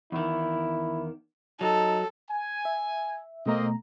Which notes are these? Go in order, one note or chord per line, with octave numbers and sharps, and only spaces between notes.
E2 D#3 E4
F#3 D#4 A4
G#5
E5
B2 A3 A#3 C4 D#5 A#5